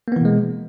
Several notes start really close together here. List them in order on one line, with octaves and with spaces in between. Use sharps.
A#3 B3 E3 B2 G#3